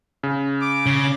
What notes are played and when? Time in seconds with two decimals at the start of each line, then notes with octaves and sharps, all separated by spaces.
0.23 C#3
0.61 D6
0.86 C#3